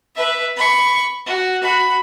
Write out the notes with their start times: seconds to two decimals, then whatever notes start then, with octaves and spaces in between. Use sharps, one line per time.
0.16 B4 E5
0.57 B5 C#6
1.26 F#4
1.63 F#4 B5